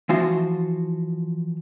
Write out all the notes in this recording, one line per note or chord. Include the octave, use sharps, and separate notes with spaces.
E3 F3 F4 F#4